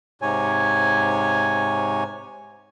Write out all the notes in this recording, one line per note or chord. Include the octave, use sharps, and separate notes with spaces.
G#2 C3 C#5 G#5